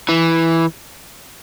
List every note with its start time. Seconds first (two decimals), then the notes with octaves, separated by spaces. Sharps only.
0.09 E3